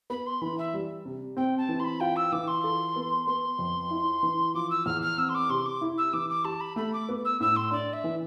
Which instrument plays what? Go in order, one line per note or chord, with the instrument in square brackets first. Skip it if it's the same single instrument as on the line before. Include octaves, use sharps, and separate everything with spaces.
[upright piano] B3 [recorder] B5
[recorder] C6
[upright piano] E3 [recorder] B5
[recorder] E5
[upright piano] G3
C3
[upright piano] C4 [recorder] G5
[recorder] A5
[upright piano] E3
[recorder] C6
B5
[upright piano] F4 [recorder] G5
[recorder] E6
[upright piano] E3 [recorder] D6
[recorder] C6
[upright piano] A4
B3
[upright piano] B3 [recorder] C6
[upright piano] F2
E4
E3
[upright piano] F3 [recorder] D6
[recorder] E6
[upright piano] E2 [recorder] F6
[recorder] F6
[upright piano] C4 [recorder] E6
[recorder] C6
D6
[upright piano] C3 [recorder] C6
[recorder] D6
[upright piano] E4
[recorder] E6
[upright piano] E3 [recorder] D6
[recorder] D6
[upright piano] G4 [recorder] A5
[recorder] B5
[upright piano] A3 [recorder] B5
[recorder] D6
[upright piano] B3
[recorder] E6
[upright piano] A2 [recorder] E6
[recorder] C6
[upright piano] D4 [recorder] D5
[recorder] E5
[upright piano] E3